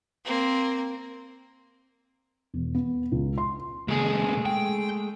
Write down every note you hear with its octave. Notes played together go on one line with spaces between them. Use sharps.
A#3 C4
E1
B3
C#2
C6
A#2 C#3 G#3 A3 G#4
G5